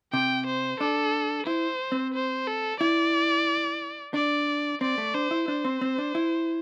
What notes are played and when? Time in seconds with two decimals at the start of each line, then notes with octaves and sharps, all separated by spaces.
0.13 C3 G5
0.46 C5
0.80 D4 A4
1.47 E4 C5
1.92 C4
2.14 C5
2.47 A4
2.80 E4 D5
4.14 D4 D5
4.81 C4 D5
4.98 A3
5.14 D4 C5
5.31 E4
5.48 D4 C5
5.65 C4
5.81 C4
5.98 D4
6.15 E4